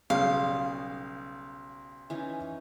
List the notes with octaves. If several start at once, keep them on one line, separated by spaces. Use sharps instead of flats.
B1 C#3 G3 F5
E3 C#4 D#4